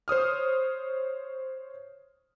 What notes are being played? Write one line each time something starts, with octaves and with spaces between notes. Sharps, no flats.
C5 C#5 D#6 F6